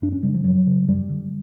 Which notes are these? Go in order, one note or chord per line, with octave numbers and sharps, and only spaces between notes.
F#2 D4
C#4
C#3 G3
F3
F#2 F#3
C#3
F#2 G3
D3